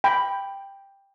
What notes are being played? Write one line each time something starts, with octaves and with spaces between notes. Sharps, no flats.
G5 B5